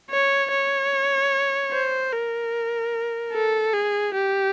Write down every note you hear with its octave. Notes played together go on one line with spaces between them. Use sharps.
C#5
C#5
C5
A#4
A4
G#4
G4